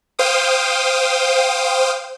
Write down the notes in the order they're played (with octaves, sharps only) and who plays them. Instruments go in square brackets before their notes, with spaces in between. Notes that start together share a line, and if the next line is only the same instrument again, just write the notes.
[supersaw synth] C5 F5 G5 D#6